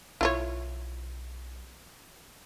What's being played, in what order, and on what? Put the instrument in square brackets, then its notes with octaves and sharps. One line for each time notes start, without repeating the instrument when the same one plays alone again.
[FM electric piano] B1 [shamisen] E4 F4 C#5